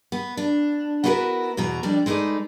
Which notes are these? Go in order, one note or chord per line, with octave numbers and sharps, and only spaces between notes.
B3
D4
B3 E4 F#4 G#4 A#4 B4
E2 B2 F#4 A#5
F2 G3 D4
G#3 A3 D#4 B4 D5